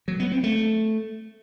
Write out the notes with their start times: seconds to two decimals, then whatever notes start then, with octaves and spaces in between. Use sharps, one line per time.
0.08 F#3
0.20 B3
0.32 C4
0.44 A3